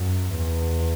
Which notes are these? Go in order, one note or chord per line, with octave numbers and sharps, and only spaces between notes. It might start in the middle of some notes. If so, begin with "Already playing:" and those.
Already playing: F#2
E2